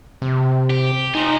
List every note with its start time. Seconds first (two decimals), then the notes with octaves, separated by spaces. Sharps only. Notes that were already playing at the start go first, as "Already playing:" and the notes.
0.22 C3
0.70 G4
1.15 D#4 F4 G#5